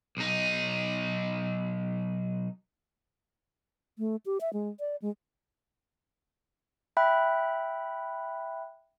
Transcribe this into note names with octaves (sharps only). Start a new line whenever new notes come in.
B1 D#4
A3
G4
E5
G#3
D5
G#3
E5 G5 B5 F#6